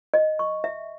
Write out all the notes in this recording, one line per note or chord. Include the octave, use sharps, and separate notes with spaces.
D#5
C#6
E5